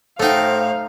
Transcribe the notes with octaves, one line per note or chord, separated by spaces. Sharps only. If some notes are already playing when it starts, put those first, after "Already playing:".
A2 A3 D#4 F#4 C5 F5 G5